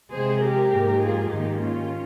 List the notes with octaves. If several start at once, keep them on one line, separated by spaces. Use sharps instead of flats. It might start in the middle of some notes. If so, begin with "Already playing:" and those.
C3 F3 G#3 G#4 C5
G4 A#4
G#2 F3 A#3
F4 G#4
G#2 D#3 A#3 D#4 G4
C#4 F4